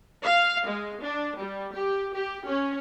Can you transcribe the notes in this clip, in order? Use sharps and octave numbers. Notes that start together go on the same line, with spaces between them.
F5
G#3
D4
G3
G4
G4
C#4